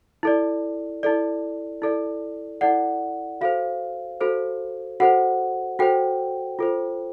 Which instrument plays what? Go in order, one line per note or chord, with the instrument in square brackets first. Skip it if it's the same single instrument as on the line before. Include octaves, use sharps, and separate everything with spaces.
[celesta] E4 A4 D5
E4 A4 D5
E4 A4 D5
E4 A4 D5 F#5
F#4 A4 C5 F5
F#4 A4 C5
F#4 A4 C5 F#5
F#4 A4 C5 G5
F4 A4 C5